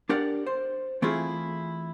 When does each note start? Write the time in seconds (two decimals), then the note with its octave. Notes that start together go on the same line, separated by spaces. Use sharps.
0.09 D4 G4 A#4 D5 F#5
0.47 C5
1.02 E3 A3 C4 E4 F4 G#4